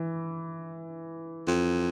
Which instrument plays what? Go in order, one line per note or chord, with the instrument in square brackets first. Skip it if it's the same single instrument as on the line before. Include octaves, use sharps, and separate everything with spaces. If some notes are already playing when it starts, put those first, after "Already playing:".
Already playing: [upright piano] E3
[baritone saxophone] F2